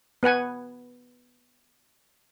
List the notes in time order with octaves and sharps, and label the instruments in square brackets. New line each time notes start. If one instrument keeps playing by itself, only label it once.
[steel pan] B3 B4 F#5 G#5